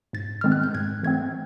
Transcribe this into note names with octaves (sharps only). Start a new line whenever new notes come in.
G#2 A6
D#3 G#3 C4 F6
F#6
G6
G#2 G#6
E3 A3 C4 G#6